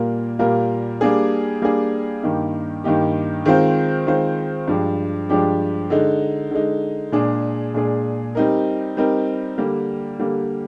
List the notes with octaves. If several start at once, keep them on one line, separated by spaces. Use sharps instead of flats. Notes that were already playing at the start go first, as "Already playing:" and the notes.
Already playing: A#2 G3 A#3 F4 A#4
A#2 G3 A#3 F4 A#4
G3 A#3 D4 G#4
G3 A#3 D4 G#4
G2 D#3 A#3 D#4 G4
G2 D#3 A#3 D#4 G4
D#3 G#3 C4 F4 C5
D#3 G#3 C4 F4 C5
G2 F3 G#3 D4 G4
G2 F3 G#3 D4 G4
D3 G#3 D#4
D3 G#3 D#4
A#2 G#3 D4 G#4
A#2 G#3 D4 G#4
G3 C4 D#4 A#4
G3 C4 D#4 A#4
D3 G3 A#3
D3 G3 A#3